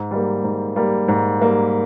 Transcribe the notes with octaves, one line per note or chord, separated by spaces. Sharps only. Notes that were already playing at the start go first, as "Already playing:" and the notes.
Already playing: G#2
G3 A#3
G#2
G3 A#3
G#2
G3 A#3